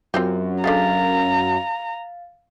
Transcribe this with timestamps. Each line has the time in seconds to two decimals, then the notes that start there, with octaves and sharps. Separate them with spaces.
0.14 F#2 C4 F4 G4
0.64 D3 G#3 F5 A#5 A6